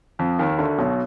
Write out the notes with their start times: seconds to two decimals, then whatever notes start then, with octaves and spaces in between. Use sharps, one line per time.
0.19 F2 F3
0.39 D#2 D#3
0.58 D2 D3
0.78 B1 B2